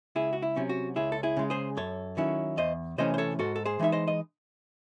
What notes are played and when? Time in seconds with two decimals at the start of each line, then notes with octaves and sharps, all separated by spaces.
0.15 C#2 E4 G#4
0.33 F#4
0.42 E4
0.56 C3 F#3 C#4
0.69 F#4
0.96 C#2 E4 G#4
1.12 A4
1.23 E4 G#4
1.37 C#3 G#3
1.50 G#4 C5
1.77 F#2 A4 C#5
2.17 D#3 F#3 C#4 E4
2.57 E2 C5 D#5
2.98 C3 E3 A3 C#4 C5 D#5
3.14 C5
3.18 A4 C#5
3.39 G#2 F#4 A4
3.56 A4
3.66 G#4 C5
3.79 E3 G#3 D#4 E5
3.92 C5 D#5
4.08 D#5